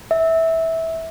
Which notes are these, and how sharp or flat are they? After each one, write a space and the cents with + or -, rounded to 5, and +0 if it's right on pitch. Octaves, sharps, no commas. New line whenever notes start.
E5 -15